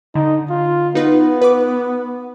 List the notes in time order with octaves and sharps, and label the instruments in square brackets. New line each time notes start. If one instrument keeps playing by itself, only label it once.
[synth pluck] D3 [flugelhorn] D#4
[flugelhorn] F4
[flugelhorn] B3 [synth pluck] D#4 F4 B4
[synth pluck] B4 D6